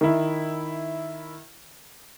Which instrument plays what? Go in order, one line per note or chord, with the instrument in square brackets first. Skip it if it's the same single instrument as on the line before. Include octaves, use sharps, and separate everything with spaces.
[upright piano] D#3 E4